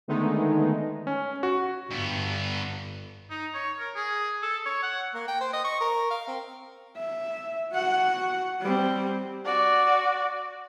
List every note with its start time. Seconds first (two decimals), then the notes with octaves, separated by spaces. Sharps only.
0.08 D3 D#3 G#3 A3 B3 D#4
1.07 C#4
1.43 F#4
1.91 G1 G2 B3
3.30 D#4
3.54 C#5
3.79 A#4
3.96 G#4
4.43 A4
4.66 C#5
4.83 F#5
5.14 A#3
5.28 G5
5.41 C5
5.53 D#5
5.64 C#6
5.81 A#4
6.10 F5
6.28 C4
6.97 E5
7.73 F#4 F#5
8.61 G3 C4
9.45 F#4 D5